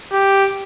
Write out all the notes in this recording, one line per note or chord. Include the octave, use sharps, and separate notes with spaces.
G4